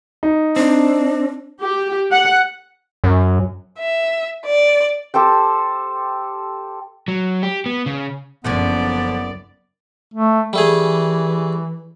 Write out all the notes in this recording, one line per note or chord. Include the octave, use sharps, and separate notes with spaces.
D#4
C4 D4
G4
F#5
F#2
E5
D5
G4 A4 C5 G5
F#3
G4
B3
C#3
F#1 F#2 D3 F3 B3 C#4 D5
A3
E3 G3 A3 G#4